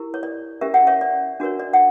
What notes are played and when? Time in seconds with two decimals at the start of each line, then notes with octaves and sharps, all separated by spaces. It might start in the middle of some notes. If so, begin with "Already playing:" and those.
Already playing: E4 G4 A#4
0.14 C#5
0.23 D5
0.61 C#4 G4 A#4 E5
0.74 F#5
0.87 C#5 E5
1.01 D5
1.40 D4 F#4 A#4 C#5
1.59 D5
1.73 F#5